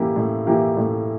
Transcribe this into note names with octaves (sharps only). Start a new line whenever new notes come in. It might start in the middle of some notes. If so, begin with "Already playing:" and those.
Already playing: A2 E3 A#3 E4 G4
A2
E3 A#3 E4 G4
A2